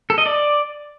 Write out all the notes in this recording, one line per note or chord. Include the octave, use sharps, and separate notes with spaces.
A4
D#5
D5